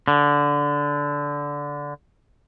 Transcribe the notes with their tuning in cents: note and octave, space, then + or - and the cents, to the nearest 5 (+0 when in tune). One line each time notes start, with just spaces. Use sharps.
D3 -15